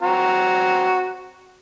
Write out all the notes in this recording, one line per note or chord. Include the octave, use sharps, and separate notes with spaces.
C4 F#4 A#5